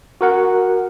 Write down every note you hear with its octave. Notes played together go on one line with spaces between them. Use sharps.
F#4 A#4 F#5